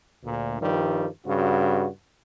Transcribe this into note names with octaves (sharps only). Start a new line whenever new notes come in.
D2 A#2
G2 D#3 F3 G3
G2 C#3 F#4